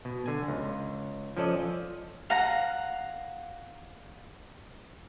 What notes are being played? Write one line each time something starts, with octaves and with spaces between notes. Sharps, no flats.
B2
D3 G#5
C#2
F3 C#4 A4 D5 D#5
F5 F#5 A#5